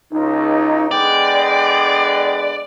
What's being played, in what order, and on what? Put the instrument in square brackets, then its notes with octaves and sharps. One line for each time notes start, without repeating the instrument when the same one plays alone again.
[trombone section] C#2 [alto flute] D#4
[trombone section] D3 G#3 B3 [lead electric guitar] D5 [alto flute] G5